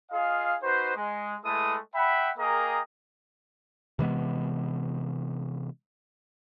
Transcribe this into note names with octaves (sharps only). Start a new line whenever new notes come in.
F4 G#4 D#5 F5
D#4 F#4 B4 C5
G#3
G#3 A3 E4 A4 B4 D#6
E5 F#5 G5 B5
A#3 G#4 A#4 D#5 G5 A#5
C3 E3 G#3 B3